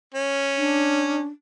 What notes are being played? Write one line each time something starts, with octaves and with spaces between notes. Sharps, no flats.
C#4
D4